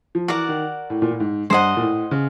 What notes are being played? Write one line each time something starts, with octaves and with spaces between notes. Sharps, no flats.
F3
E3 F#4 A#4 D5 F#5
D#3
A2
A#2
A2
G#2
G2 C5 D#5 F#5
A#2
A2
C#3